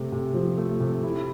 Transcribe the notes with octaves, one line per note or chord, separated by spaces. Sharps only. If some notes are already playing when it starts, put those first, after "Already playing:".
Already playing: C3 A3
C3
F3
A3
C3
E4